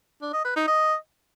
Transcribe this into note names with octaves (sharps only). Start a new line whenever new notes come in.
D4
D#5
B4
D#4
D#5